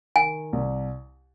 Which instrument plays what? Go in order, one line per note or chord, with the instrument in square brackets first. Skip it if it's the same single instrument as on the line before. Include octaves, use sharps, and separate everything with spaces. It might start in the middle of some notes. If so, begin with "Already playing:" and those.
[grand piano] D#3 [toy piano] G#5
[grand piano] C2